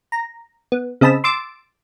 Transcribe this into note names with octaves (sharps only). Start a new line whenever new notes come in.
A#5
B3
C#3 C4 D#5 A5 B5 E6
C6 D6 E6 A6 D7